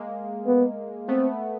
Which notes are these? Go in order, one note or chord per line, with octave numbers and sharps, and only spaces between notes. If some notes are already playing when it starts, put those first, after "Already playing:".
Already playing: G#3 A#3
B3
A3 B3 C4